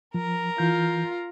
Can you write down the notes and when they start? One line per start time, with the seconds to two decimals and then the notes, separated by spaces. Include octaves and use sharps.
0.14 F3 A#4 A#5
0.58 E3 F4 G6